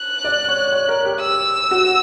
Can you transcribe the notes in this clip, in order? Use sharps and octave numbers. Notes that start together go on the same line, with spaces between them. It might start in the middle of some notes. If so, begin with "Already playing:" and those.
Already playing: F#6
D5
C#5
C#5
A#4
G4
E6
F#4